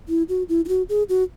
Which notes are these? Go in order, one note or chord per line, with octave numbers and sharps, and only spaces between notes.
E4
F#4
E4
E4
F#4
G#4
F#4